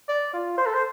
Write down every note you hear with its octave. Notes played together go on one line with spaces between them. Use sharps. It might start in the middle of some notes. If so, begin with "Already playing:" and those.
D5
F4
C5
A4
C5